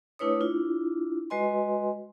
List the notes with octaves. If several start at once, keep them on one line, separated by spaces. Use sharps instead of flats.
A3 D4 E4 B4 C#5 D#6
D4 E4 F4
G#3 F#4 B4 D#5 G#5 C6